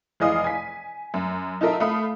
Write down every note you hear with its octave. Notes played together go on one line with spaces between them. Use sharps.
F1 E3 G#4 D#5 F5 D#6
G#5 B6
F#2
D#4 F4 A4 A#4 D#5 E5
A3 F5 B5 D#6